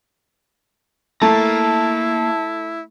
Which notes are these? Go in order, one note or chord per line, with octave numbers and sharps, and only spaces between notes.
A3 A#3 E4 A5 A#5